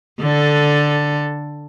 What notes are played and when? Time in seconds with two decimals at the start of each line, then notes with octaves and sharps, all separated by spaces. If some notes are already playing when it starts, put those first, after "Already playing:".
0.20 D3 A4